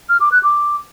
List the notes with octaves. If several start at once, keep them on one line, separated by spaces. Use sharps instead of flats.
F6
D6
F#6
D6